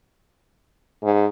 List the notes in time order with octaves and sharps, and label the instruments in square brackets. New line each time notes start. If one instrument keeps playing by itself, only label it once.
[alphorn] G#2